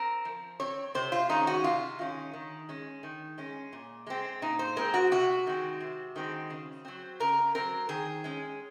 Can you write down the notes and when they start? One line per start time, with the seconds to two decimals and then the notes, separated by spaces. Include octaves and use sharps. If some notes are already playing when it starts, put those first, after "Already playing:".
Already playing: C4 A#4
0.25 F3
0.60 C4 C#5
0.95 C3 C5
1.12 F4
1.29 D#3 G#3 C#4 D#4
1.47 F#4
1.64 C3 F4
1.99 D#3 G#3 C#4
2.33 D#3
2.69 G#3 C#4
3.03 D#3
3.38 G#3 C#4
3.73 A#2
4.07 G#3 C4
4.42 A#2 D#4
4.59 C5
4.76 G#3 C4 A#4
4.94 F#4
5.12 C3 F#4
5.47 D#3 G#3 C4
5.81 C3
6.16 D#3 G#3 C4
6.50 C#3
6.85 F#3 C4
7.20 C#3 A#4
7.55 F#3 C4 A#4
7.89 D#3 G#4
8.24 G#3 C#4